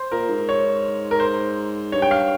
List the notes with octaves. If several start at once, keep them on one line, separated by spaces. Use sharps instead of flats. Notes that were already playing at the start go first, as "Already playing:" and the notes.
Already playing: C5
A#2 A#4
G#2
C#5
A#4
C5
G2 C#5
G5
F5